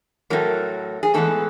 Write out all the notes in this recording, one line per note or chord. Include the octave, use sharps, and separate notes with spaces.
A2 F#3 A3 C4 A#4
G#4
A2 E3 G#3 B3 A4